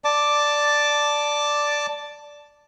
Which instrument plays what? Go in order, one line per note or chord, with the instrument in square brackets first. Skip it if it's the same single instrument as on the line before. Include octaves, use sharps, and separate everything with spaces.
[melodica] D5 A5 D6